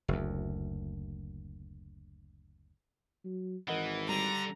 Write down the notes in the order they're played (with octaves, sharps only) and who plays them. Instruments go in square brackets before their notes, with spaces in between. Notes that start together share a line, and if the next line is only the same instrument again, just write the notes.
[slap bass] F#1 D2
[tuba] F#3
[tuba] G#1 [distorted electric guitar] E3 [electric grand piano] A#4 D#5 F#5
[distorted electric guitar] D3 [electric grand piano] G3 [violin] A#5